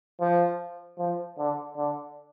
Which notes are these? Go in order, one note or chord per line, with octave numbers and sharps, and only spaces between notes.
F3
F3
D3
D3